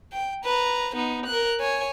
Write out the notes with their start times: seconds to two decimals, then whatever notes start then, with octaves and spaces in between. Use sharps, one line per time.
0.13 G5
0.44 B4 A#5
0.95 B3 D#4
1.26 A#4 F#6
1.60 C#5 G#5